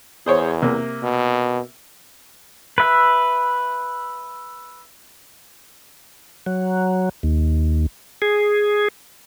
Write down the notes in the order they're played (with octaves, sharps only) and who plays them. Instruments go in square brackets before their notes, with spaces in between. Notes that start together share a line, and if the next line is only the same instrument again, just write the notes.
[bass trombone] E2 [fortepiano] G#4 C5 C#5
[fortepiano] C3 A#3
[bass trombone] B2
[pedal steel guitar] B4 E5
[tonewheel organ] F#3
D#2
G#4